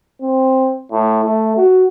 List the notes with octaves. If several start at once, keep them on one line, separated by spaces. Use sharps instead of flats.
C4
A2
A3
F#4